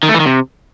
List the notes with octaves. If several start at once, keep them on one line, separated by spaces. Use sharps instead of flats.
D#3
A3
E3
D#3
C3